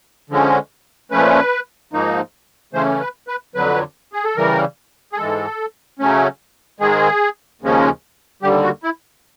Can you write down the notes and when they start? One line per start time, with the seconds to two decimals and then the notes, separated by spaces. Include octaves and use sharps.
0.30 D3 F3 G#3 C#4
1.11 A#2 F3 A3 C#4 B4
1.93 G#2 F3 A#3 D#4
2.73 C#3 E3 A3 C#4 C5
3.00 B4
3.28 B4
3.55 F2 D3 F#3 B4
4.13 G#4
4.24 A4
4.36 C#3 E3 G3 A#4
5.13 G#4
5.17 G#2 E3 G#3 A4
5.99 C#3 F#3 A3 C#4
6.80 G#2 D#3 G#3 G#4
7.61 D#2 C#3 F3 G#3 C#4
8.42 D#2 D3 G3 G4
8.63 F#4
8.83 E4